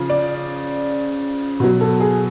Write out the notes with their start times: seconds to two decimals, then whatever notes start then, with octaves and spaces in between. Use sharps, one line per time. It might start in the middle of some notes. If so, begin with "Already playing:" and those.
Already playing: C#3 F3
0.10 D5
1.60 B2 F#3
1.81 A4
2.00 G#4